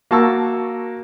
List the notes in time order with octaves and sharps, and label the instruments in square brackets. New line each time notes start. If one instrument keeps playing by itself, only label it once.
[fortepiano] A#3 F#4 A5 C#6 E6